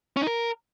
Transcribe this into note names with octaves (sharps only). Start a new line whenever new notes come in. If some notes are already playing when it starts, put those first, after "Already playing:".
C#4
D#4
A#4